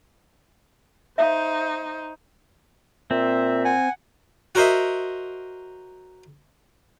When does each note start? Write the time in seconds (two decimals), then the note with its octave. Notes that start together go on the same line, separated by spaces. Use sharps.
1.18 D#4 C5 E5 F5
3.11 A#2 C4 E5
3.65 F#5 G#5
4.55 F#4 A#4 C5 D#5 E5